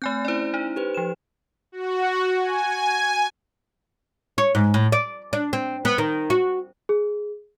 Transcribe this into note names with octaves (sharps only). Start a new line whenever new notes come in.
A3 C4 G#5 G6
C#4 E4 C5 D5
D#4
G4 B4 C5
F3 E7
F#4
G#5
C#5
G#2
A2
D5
D4
C4
B3
D#3
F#4
G#4